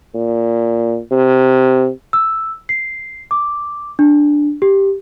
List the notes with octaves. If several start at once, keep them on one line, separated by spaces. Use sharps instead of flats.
A#2
C3
E6
C7
D6
D4
G4